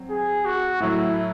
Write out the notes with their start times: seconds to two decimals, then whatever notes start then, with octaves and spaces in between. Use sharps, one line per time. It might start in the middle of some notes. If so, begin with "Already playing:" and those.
Already playing: F#3 C4
0.10 G#4
0.45 F#4
0.80 A2 F#3 A3 E4